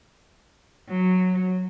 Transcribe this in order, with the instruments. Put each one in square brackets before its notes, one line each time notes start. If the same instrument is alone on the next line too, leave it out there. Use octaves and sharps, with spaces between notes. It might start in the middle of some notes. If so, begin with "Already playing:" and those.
[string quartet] F#3